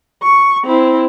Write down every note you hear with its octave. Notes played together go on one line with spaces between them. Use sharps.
C#6
C4 E4